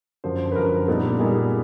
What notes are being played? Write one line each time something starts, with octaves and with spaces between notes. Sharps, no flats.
F#2 D3 F3 C5
B4
F#2 D3 F3 A#4
A#2 G3 B3 D#4 A4
A#2 G3 B3 D#4 G#4